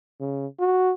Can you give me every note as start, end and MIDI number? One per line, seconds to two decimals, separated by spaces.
0.20 0.47 49
0.60 0.92 66